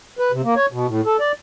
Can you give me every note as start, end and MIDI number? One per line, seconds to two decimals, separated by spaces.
0.19 0.32 71
0.32 0.42 48
0.44 0.54 58
0.56 0.66 73
0.72 0.86 47
0.88 1.01 45
1.06 1.17 69
1.20 1.32 74